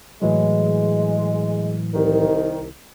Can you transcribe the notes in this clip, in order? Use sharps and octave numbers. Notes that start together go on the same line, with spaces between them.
A2 E3 F#3 G#3
C2 D#3